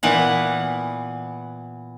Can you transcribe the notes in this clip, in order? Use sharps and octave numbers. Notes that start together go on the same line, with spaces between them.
A#2 E3 B3 F#5